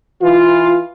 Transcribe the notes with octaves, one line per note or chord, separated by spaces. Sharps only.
E3 F4